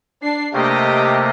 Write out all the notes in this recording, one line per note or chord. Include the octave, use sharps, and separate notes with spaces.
D4 C7
C3 A3 A#3 G4 D#5